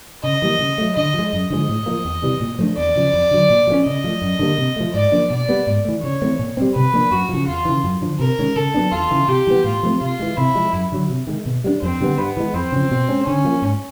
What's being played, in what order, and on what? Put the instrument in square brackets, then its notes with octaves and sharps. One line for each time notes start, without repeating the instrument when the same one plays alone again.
[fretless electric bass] C#3 [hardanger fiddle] D#5
[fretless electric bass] E3 G3 A#3
C#3
F#3 A3
[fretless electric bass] D3 [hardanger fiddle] D#5
[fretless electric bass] F3 G#3
[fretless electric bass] F#2 [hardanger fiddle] D#5
[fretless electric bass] D3 F3 G#3
A2
F3 A#3
E2
C3 E3 G3
A#2
F3 A3 D4
[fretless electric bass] E2 [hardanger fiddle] D5
[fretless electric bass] C#3 F3
F2
D3 F#3
A#2
F3 A3 C#4
[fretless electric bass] C#3 [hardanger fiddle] D#5
[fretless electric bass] F3 A3
F#2
D3 G3 A#3
C3
F3 A3
[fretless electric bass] G#2 [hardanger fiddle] D5
[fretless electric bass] F3 A#3 D4
[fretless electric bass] B2 [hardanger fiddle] D5
[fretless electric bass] G3 B3
G#2
E3 A3
[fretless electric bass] C#3 [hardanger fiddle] C#5
[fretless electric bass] E3 A3 C4
A#2
G3 C4
[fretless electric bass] C3 [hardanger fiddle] B4
[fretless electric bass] F3 A#3 D4
[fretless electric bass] F#2 [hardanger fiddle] F#4
[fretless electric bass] C#3 F3
[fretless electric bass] E2 [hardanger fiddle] F4
[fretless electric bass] C#3 E3
F#2
D3 F3
[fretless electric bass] C3 [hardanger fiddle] A#4
[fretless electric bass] D#3 G#3 C#4
[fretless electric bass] C#3 [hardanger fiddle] A4
[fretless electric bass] F#3 B3 D4
[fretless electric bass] E2 [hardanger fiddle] F4
[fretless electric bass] C#3 E3
[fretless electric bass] C3 [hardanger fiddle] G4
[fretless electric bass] E3 G3 B3
[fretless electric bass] A2 [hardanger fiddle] F4
[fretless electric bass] F3 A3 C4
[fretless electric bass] C3 [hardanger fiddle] F4
[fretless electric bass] E3 G#3
[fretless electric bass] C3 [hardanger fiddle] E4
[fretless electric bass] F3 G#3
F#2
D3 F#3
C3
D#3 G#3
B2
G3 A#3 D4
[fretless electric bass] F2 [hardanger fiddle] C4
[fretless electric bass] D3 G3 B3
[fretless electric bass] G2 [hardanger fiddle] B3
[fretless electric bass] E3 G#3
[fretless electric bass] F2 [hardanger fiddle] C4
[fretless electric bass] C#3 F3
B2
G#3 C#4
[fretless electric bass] D3 [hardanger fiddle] C#4
[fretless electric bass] F3 A#3
G#2